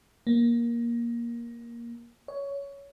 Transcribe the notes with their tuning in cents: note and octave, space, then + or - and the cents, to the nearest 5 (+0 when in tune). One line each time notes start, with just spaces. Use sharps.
A#3 +15
C#5 +15